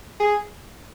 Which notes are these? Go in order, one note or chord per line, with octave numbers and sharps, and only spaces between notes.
G#4